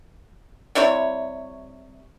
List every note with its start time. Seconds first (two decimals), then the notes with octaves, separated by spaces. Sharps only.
0.75 C3 G3 E4 C#5